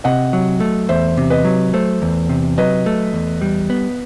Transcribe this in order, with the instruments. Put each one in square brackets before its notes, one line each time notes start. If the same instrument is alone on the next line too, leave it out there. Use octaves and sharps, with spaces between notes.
[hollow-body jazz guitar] C3 [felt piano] D#5 F#5
[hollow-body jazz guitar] F#3
A3
[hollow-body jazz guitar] E2 [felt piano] C5 E5
[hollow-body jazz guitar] C3
[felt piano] B4 D#5
[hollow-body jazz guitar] F#3
[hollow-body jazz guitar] A3 [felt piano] C5
[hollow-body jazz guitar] E2
C3
[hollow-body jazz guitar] F#3 [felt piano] B4 D#5
[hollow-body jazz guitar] A3
E2
G3
B3